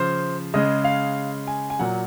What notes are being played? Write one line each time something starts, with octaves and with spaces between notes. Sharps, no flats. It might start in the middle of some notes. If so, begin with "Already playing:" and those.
Already playing: C#3 F3 C5
C#3 G#3 D#5
F5
G#5
G#5
A#2 F#3 F#5